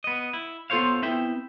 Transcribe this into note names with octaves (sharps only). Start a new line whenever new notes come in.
B3 D#5
E4
B3 F4 A4 C5 C#5 F5
B3 C4 E4 E5 G5